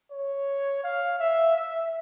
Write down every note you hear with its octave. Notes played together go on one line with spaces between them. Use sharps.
C#5
F5
E5
E5